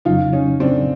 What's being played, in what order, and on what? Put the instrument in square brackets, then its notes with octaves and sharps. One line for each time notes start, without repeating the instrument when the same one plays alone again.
[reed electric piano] F2 C#3 F#3 [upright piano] D#4 F4
[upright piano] C#4 D#4
C4 D4